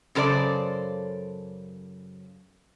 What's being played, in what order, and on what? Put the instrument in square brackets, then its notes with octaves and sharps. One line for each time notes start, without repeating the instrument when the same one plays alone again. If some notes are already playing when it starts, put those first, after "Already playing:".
[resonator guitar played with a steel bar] F#2 C#3 A4 C5 D5